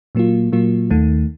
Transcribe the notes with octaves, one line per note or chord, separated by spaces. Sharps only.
A#2 F#3 A#3 F4
A#2 F#3 A#3 F4
D#2 D#3 A3